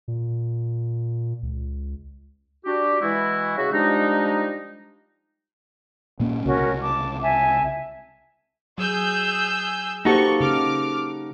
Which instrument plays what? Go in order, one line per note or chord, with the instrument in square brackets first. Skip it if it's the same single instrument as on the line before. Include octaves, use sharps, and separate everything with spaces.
[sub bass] A#2
C#2
[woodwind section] D4 F#4 G4
E3 G#3 E4 F#4
C#3 F#4
F3 G3 G#3 D4 D#4
[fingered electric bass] A#2 A#3 C#4
[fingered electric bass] C2 C#3 [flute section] C#4 F#4 A#4
[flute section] A5 D6
E5 G#5 A5
[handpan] F#3 [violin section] G#4 E6 G6
[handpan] A#3 G4 C5 [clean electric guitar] D#4 F#4 A4 [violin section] C#6
[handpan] C#3 [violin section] D6 F6